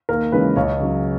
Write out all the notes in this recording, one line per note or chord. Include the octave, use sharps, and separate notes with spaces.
D#2 A#4
C#3 E3 G#3 C#4 B4
C#2 C#5
C#3 F#3 C#4